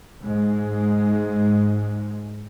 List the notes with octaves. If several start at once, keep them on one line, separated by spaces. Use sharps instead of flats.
G#2 G#3